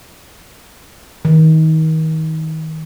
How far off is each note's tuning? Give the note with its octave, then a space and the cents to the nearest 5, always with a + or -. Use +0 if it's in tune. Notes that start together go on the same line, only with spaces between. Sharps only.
D#3 +30